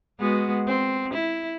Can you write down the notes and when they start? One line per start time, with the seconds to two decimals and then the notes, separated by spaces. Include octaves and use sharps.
0.20 G#3 B3 F#4
0.67 C4
1.14 E4